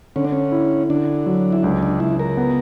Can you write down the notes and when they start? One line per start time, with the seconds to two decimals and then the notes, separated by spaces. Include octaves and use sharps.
0.16 D3 C#4
0.25 D4
0.32 C#4
0.52 E4
0.89 D3 D4
1.26 F#3
1.52 E4
1.63 C#2 D4
1.83 D4
2.00 C#2 E4
2.19 A#4
2.37 B3